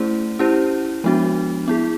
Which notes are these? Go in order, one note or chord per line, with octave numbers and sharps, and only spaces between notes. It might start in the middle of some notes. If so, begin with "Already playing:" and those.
Already playing: A3 C#4 E4 G#4 C5
C#4 E4 G4 C5
F3 G#3 B3 D4 F#4
B3 E4 G#4